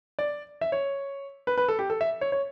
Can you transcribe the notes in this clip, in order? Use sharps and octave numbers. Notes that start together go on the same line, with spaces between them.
D5
E5
C#5
B4
B4
A4
G4
A4
E5
C#5
C#5